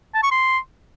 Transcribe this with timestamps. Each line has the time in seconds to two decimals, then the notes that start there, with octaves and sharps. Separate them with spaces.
0.14 A5
0.23 C#6
0.31 C6